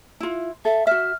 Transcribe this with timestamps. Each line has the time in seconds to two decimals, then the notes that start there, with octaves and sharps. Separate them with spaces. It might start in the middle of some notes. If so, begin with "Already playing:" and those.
0.20 E4 F4
0.65 A4 E5
0.87 F#4 E5 F6